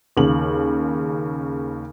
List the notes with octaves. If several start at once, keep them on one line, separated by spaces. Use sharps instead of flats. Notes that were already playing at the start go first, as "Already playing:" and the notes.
D#2 C#3 F#7